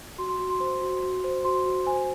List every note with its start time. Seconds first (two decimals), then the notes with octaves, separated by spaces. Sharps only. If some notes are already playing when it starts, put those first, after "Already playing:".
0.18 F#4 C6
0.29 C6
0.39 F#4
0.50 C6
0.60 C5
0.81 F#4
1.02 F#4
1.24 C5
1.45 F#4 C6
1.66 F#4
1.87 C5 G#5